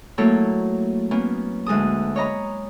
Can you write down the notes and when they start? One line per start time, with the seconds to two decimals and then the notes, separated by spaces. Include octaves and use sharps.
0.18 F#3 A3 A#3 E4 A4 C#5
1.11 A#3 B3 C#4
1.66 D2 G#3 A4 D#6
2.16 C#5 D#5 A#5 B5